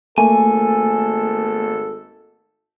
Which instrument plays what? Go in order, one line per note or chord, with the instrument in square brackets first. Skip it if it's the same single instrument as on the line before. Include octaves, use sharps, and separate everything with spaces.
[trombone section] G#1 A4 [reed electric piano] A3 A#3 [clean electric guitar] G#5